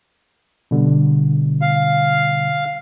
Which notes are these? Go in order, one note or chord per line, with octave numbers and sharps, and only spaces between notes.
B2 D3 G3
F5